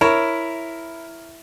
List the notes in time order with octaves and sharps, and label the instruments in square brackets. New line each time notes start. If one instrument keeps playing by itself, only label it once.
[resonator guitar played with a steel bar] E4 [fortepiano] A#4 C#5